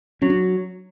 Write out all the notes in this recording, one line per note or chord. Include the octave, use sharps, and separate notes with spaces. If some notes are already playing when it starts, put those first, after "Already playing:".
F#3 C#4
D4